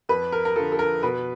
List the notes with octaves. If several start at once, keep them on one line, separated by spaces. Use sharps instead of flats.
F2 B4
A#4
A#4
D3 F3 A4
A4
A#4
B2 B4